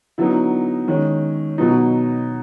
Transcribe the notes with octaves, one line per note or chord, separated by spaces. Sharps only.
D3 F#3 B3 D#4 E4
D#3 G#3 C#4
B2 F#3 B3 D#4